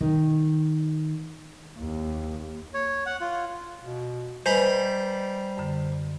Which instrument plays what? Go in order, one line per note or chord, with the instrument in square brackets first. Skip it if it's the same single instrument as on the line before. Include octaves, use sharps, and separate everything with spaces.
[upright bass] D#3
[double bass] D#2
[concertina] C#5
F#5
F4
[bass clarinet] B2
[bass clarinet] G3 [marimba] B4 D#5 G#5 [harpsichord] C5 A#5 B5
[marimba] F#2 D3